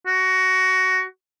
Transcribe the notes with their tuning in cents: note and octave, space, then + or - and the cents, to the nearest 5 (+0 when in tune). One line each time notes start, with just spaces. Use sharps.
F#4 +15